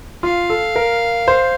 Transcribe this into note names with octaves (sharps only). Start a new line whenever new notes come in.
F4 F5
A4
A#4
C5